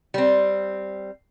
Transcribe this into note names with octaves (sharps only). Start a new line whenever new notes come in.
G3 C4